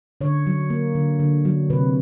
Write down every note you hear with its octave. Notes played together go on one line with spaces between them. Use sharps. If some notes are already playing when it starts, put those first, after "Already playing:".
D3 C#5
F#3
A#3
D3
D3
F#3
C3 B4